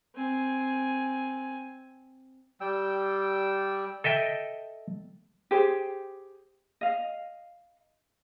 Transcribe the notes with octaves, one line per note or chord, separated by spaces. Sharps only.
C4 G#5
G3 G5 E6
A4 D#5 E5 G5
G4 G#4 C5
D#5 F5